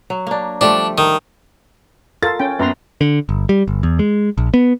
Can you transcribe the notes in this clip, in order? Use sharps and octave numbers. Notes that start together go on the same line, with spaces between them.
F#3
A#3 D4
F3 G3 A3 D4
D#3
F4 A4 A#4 A6
C#4 G5
F#2 B3 B4 A#5 C6
D3
G1
G3
G1
E2
G#3
A#1
B3